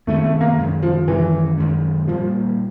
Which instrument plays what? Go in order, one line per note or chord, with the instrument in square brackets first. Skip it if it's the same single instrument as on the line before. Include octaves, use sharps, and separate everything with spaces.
[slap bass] F#2 D#3 G#3 C#4 [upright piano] A3
[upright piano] A3
A#3
[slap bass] F#2 D#3 G#3 C#4
[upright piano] F3
[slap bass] F#2 D#3 G#3 C#4 [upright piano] E3
[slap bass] F#2 D#3 G#3 C#4
[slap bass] A#2 G3 A#3 [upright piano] F3